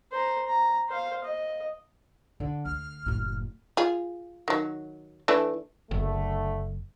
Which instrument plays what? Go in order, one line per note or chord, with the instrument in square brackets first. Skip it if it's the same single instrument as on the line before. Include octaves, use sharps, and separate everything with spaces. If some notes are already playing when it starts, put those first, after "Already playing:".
[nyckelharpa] C5 A#5
A#5
C5 F5
D#5
[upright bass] D3
[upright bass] D2 [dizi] F6
[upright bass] F#1 A2
[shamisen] F4 G#4
D#3 F#3
E3 A3 D4
[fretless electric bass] F#1 [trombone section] D3 A3